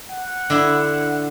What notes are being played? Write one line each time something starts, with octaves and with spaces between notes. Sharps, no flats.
F#5
D3 E4